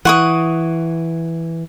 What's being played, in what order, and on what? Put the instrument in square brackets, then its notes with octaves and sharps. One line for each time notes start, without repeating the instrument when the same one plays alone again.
[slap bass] E3 [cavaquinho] F#5 C#6 D#6